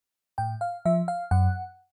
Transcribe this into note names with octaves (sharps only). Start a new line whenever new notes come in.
A2 G5
F5
F3 E5
F5
F#2 F#5